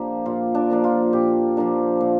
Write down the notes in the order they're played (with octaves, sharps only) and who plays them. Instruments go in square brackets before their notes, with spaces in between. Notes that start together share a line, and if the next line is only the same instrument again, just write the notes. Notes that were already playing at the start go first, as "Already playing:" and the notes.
Already playing: [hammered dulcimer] A#2 F3 A#3 D4 G4
A#2 F4
D4
F3 A#3 D4
F4
A#2 G4
F3 A#3 D4
A#2